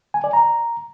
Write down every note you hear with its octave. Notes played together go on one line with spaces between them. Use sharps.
G#5
D5
A#5